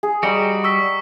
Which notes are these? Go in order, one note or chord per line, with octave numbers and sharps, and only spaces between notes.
G#4
G3 F#4 D#5 G5 A#5
C#6 E6 B6